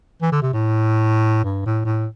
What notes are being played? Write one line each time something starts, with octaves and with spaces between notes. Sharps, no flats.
E3
D3
C3
A2
G2
A2
A2